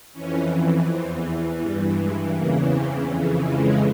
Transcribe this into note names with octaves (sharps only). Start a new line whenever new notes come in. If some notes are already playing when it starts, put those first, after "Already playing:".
F2 E3 C#4
E2 E3 C4
G2 E3 G3
G#3
E2 C#3 E3 A#3
C4
F2 C#3 E3
G#3